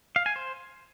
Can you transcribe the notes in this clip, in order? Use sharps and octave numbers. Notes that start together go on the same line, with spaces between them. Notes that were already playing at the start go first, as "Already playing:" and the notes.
F5
G#5
C5